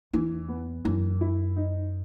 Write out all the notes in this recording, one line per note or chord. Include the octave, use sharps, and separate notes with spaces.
E2 E3
B3
F#2 E3
E4
D#4